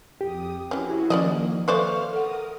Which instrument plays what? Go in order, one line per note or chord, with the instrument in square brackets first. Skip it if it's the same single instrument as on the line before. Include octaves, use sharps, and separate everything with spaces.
[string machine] F2 D#6 [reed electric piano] G4
[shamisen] E3 C#4 [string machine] E4 F#4 G#4
[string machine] D#3 A#3 [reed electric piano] F3 [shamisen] C#4 D5 D#5
[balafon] A4 E5 F5 [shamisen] B4 C5 D5 [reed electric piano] C#6 [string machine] F6
[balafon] A4 F#5 [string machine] A#4 D#6